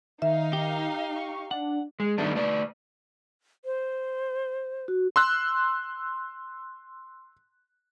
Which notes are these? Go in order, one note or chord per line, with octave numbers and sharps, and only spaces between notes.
D#3 D#4 E5 F5
G4
C#6
D4 F#5
G#3
D#3 G3 A3 B3 D4
A3 B4 D5
C5
F#4
C6 E6 F#6